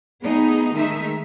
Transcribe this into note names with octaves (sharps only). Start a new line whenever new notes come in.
A3 B3 D#4 G#4
D#3 G#3 A3 D#4 E5